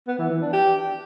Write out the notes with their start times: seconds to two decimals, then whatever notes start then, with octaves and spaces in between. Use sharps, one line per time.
0.07 B3
0.19 E3
0.30 E3
0.42 D4
0.53 G4